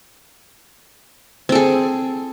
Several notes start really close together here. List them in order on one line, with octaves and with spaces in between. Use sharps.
C4 A4 G#4